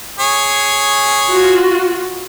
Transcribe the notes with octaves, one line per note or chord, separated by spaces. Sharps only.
G#4 C#5
F4 F#4